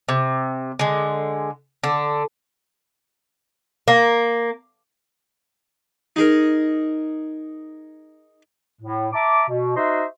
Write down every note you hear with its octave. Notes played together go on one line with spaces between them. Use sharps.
C3
D3 G#3
D3
A#3
D#4 G#4 A#4
A2
E5 A5 A#5 D6
B2
D#4 F#4 C5 D#5 E5 C6